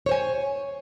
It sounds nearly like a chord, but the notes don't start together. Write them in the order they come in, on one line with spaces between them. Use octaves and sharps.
C#5 C5 G#5